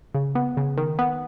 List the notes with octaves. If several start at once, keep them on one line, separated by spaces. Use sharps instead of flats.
C#3
B3
C#3
D#3
B3